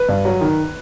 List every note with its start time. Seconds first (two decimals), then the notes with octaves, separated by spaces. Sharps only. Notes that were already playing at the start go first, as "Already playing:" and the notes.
Already playing: B4
0.09 G2
0.25 F#3
0.41 D#3